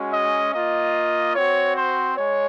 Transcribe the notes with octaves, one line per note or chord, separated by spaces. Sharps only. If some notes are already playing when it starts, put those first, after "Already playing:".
Already playing: G#3 C#4 F#4
D#5
A#3 F4 D#5
C4 F#4 C#5
C5
G#3 C#5